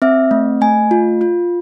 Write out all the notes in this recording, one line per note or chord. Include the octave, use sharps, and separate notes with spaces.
C4 E5
A3
A3 G#5
F4
F4